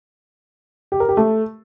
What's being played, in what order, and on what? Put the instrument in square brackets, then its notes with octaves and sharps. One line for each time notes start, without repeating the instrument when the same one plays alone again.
[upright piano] G4
A#4
G4
A3